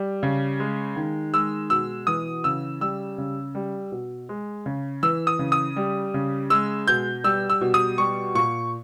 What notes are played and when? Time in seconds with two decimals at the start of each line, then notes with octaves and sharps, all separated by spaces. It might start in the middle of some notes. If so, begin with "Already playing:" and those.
Already playing: G3
0.23 C#3
0.60 G#3
0.96 D#3
1.33 G#3 E6
1.70 B2 E6
2.07 E3 D#6
2.44 C#3 E6
2.81 G3 E6
3.18 C#3
3.55 G3
3.92 B2
4.29 G#3
4.66 C#3
5.03 E3 E6
5.27 D#6
5.39 C#3
5.52 D#6
5.76 G3
6.14 C#3
6.50 G#3 E6
6.88 B2 G6
7.24 G3 E6
7.50 E6
7.61 B2
7.74 D#6
7.98 G3 C#6
8.35 A#2 C#6